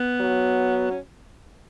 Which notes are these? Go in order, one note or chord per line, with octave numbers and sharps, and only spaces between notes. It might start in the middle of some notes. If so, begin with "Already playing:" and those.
Already playing: B3
F#3
C#4